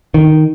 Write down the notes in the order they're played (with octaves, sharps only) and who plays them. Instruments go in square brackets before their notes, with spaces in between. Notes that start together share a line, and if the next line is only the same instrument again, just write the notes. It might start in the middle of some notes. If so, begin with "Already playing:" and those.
[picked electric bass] D#3